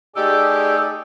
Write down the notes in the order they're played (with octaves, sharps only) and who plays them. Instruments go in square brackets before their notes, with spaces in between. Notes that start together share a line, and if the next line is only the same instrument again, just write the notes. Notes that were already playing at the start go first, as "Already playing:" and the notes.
[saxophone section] A3 D#4 G4 [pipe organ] G#4 D5 [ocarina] E6